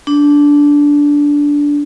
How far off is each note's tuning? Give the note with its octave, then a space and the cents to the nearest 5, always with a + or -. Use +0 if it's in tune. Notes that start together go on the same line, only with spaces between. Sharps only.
D4 -15